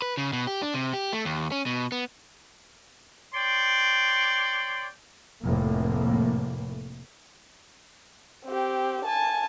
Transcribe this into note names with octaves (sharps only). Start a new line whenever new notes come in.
B4
C#3
B2
G4
D4
C3
G4
A3
D#2
C#4
B2
B3
C#5 D5 G5 C6
F1 A2 A#3
C4 G4
G#5 A5